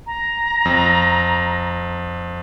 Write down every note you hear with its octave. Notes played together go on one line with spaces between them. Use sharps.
A#5
F2